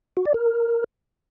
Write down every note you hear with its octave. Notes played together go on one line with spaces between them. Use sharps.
F#4
D5
A#4